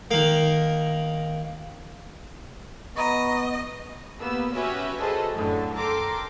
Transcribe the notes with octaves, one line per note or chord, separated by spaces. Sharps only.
D#3 A#3
B3 D#5 A#5 B5 C#6
A#3 B3 G4 E6
C#4 F#4 G4 B4 E5 G#5
F#4 G#4 A4 B4 C5 D#5
F#2 A2 D3
A4 A#4 G5 A#5 C6 D6